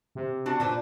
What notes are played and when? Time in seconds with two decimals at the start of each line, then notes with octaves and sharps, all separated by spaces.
0.15 C3
0.46 D4 F#4 A5
0.60 A#2 D4 B4 C5